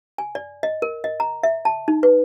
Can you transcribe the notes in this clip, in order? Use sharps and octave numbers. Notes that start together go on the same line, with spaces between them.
G#5
D5
D#5
A#4
D#5
A#5
E5
A5
D#4
B4